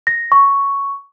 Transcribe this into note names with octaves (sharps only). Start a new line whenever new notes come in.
A#6
C#6